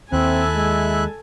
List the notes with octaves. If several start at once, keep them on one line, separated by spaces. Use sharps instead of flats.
D#2 C4 E4 A4 E5 G#5 F#6
G#3